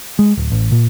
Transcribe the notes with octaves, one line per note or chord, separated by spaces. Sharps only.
G#3
D1
A1
A#2